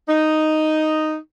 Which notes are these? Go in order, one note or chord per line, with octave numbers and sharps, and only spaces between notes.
D#4